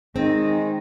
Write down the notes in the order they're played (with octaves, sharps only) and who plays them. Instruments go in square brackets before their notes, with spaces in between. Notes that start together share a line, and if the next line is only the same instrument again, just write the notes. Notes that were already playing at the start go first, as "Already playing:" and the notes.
[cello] D#3 D#4 [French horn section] G#3 [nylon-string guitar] C4